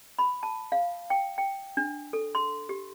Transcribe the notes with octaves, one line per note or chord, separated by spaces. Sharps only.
B5
A5
F5
G5
G5
D4
A4
C6
G4